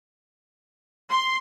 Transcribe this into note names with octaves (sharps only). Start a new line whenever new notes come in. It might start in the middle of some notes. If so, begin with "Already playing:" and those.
C6